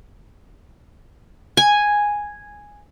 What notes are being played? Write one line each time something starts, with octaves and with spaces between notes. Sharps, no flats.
G#5